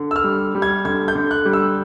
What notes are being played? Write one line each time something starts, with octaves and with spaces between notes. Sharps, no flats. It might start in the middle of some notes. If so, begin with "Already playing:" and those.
Already playing: D3
E6
F6
G3
G3
G#6
D3 G#6
G6
D3
F#6
G3
E6